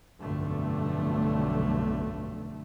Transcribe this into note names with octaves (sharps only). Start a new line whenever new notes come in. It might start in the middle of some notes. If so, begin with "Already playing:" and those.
F1 B1 G2 D3 A3